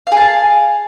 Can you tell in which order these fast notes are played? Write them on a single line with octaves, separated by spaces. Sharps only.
F5 G#4 A5